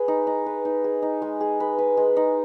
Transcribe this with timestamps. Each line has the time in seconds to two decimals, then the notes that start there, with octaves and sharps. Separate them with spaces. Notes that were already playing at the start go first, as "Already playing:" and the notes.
Already playing: G#4 B4
0.08 D#4
0.27 D#4
0.46 B4
0.65 D#4
0.84 G#4
1.02 D#4
1.22 G#3
1.40 G#4
1.60 B4
1.78 B4
1.97 G#3
2.17 D#4